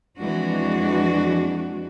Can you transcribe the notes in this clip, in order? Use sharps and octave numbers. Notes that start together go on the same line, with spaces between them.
F2 E3 G#3 D4 F#4